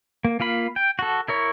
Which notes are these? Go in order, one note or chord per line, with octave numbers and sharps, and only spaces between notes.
A#3
A#3 F4 F5 B5
G5
F#4 A4
E4 A#4 C#5